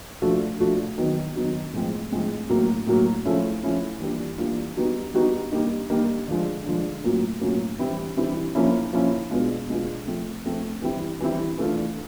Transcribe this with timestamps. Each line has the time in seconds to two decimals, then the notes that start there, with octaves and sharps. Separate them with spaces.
0.22 F3 A3 D4 F#4
0.60 F3 A3 D4 F#4
0.98 D#3 F#3 B3 D#4
1.36 D#3 F#3 B3 D#4
1.73 A2 F3 G#3 C4
2.12 A2 F3 G#3 C4
2.49 A2 F#3 A#3
2.87 A2 F#3 A#3
3.25 F3 A3 C#4 E4
3.63 F3 A3 C#4 E4
4.00 E3 G3 A#3 D4 F4
4.38 E3 G3 A#3 D4 F4
4.77 G3 B3 D#4 F#4
5.14 G3 B3 D#4 F#4
5.52 G3 A#3 D#4
5.90 G3 A#3 D#4
6.28 D3 F3 G#3
6.66 D3 F3 G#3
7.04 A2 F#3 A#3 C#4 F4
7.41 A2 F#3 A#3 C#4 F4
7.79 E3 G3 C4 E4
8.17 E3 G3 C4 E4
8.55 F3 A#3 C#4 E4
8.93 F3 A#3 C#4 E4
9.31 B2 G#3 B3 D4 F4
9.69 B2 G#3 B3 D4 F4
10.06 F3 A3 C4
10.45 F3 A3 C4
10.82 E3 G3 C4 E4
11.21 E3 G3 C4 E4
11.58 E3 A3 D4 F4